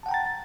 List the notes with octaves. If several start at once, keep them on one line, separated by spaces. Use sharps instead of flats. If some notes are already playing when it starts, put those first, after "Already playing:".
F#5 G5 A5 A#5 A6